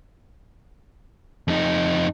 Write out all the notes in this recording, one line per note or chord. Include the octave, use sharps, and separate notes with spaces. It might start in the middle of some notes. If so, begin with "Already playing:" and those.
F2 D#4